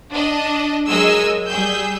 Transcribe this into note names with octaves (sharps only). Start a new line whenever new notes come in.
D4 D#5
F#3 G#3 A#4 D#5 G#5 E6
G3 G#4 E6 G6